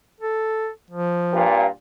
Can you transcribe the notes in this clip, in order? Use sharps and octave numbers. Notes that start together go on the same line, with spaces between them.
A4
F3
G2 A#2